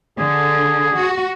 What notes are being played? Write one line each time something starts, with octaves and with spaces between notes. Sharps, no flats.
D3 G#4
F#4